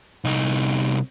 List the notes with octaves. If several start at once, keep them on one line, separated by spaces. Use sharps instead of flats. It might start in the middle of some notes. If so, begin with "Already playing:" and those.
C2 D#4